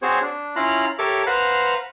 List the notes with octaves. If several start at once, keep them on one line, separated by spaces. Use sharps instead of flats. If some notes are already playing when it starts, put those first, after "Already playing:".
C4 F#4 G#4 C5 C#5
D4
C#4 E4 F4 F5 A#5 B5
G4 A4 A#4 C#5 E5 D6
B4 C5 F5 F#5 A#5 B5